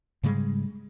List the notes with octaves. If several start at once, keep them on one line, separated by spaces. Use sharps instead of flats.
G#2 C#3 G3 G#3